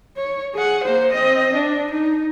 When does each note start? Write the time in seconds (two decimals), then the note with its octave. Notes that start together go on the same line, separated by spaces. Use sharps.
0.17 C#5
0.54 G#4 F#5
0.84 A#3 C5
1.13 C4 D#5
1.54 D4
1.91 D#4